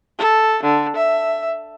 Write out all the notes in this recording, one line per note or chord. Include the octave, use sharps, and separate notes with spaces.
A4
D3
E5